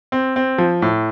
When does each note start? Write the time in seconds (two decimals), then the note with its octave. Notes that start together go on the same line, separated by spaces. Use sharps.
0.12 C4
0.36 C4
0.58 F3
0.82 A2